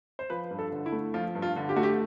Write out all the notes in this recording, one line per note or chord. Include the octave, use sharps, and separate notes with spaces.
C5
F3 B4
G2
A4
D3
E4
A3
F3 F4
G2
F4
D3
G4
A3 F#4
G4